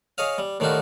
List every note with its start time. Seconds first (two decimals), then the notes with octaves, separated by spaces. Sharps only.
0.18 G#4 C#5 D#5 F5
0.38 G3
0.60 A2 D#3 G3 D#4 F4 F#4